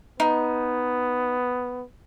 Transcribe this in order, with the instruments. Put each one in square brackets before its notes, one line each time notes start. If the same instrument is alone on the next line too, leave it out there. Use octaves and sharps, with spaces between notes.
[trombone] B3 [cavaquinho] D#4